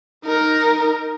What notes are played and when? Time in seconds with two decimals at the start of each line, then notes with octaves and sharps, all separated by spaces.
0.25 D#4 A#4